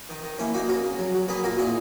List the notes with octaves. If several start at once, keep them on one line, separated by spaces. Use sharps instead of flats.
D#3
D#3
A#3 C#4 E4
A#3 D#4 F#4
C#3 F#4 A#4
C#3
F#3
F#3
A#3 G#4 B4
A#2 F#4 A#4
A#2 E4 G#4